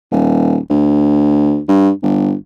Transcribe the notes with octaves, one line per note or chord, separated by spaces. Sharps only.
D#1
D2
G2
G1